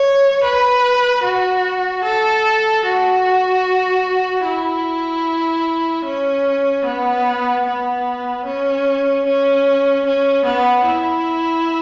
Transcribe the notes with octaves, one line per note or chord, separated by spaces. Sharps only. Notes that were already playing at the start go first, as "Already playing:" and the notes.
Already playing: C#5
B4
F#4
A4
F#4
E4
C#4
B3
B3
C#4
C#4
C#4
B3
E4